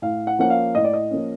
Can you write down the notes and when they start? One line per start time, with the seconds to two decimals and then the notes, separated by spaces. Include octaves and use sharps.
0.02 A2 F5
0.27 F#5
0.39 F3 A#3 C#4 F#5
0.50 F5
0.75 A2 D#5
0.84 D5
0.94 D#5
1.10 F3 A#3 C#4